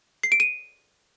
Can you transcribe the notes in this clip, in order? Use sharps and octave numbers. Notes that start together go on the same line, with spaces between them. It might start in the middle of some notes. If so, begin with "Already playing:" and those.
C7
D7
D#7